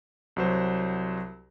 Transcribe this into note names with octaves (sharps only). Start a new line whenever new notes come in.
C2 F#3 C5